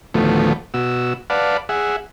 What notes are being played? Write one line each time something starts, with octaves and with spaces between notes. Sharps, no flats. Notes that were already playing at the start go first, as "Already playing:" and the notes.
D2 A2 D#3 F3 A3 B3
B2 F#4 E6
B4 D5 F5 F#5 A5
G#4 E5 F#5